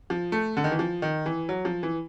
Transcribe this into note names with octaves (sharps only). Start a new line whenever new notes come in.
F3
A3
D3
D#3
E3
F3
D#3
E3
F#3
F3
E3